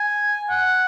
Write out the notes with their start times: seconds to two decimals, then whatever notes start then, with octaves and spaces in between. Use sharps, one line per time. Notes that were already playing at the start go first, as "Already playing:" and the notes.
Already playing: G#5
0.50 F#5